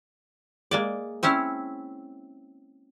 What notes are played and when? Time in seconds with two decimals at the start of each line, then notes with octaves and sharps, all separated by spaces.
0.71 G#3 A#3 D5
1.23 C4 C#4 E4 C#5